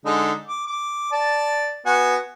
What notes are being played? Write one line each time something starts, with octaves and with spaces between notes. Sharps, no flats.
D3 G#3 D#4
D6
D6
D5 A5
B3 F#4 G#5